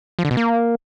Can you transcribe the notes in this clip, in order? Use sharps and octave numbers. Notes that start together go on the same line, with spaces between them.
F3
D3
B2
A#3